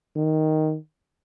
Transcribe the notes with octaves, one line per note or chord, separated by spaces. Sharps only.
D#3